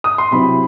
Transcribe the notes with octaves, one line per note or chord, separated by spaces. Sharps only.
D#6
C6
C3 F#3 C4 E4 B5